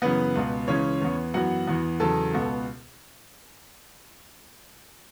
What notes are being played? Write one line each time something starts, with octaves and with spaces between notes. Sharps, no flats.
F#2 C#3 E3 B3 B4
C#2 B2 B3
C#2 C#3 E3 C#4 C#5
E2 E3 B3
F#2 E3 B3 F#4 F#5
E2 E3 B3
E2 C#3 F#3 A4 A5
C#2 B2 B3